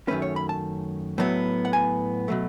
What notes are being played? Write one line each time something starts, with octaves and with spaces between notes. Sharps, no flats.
F#2 D#3 A3 C#4 B4
C#5
B5
A5
A2 F#3 B3
F#5
G#5
B2 F#3 A3